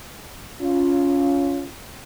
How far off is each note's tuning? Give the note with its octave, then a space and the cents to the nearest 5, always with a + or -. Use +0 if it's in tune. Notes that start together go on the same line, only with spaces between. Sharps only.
C#4 +20 F4 +5